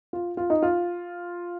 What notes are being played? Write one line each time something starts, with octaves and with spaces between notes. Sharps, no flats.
F4
F4
D#4
F4